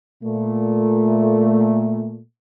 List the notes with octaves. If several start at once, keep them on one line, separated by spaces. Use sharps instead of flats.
A#2 A3